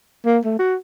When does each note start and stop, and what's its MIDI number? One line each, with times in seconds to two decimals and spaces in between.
0.25 0.39 58
0.45 0.56 57
0.59 0.75 66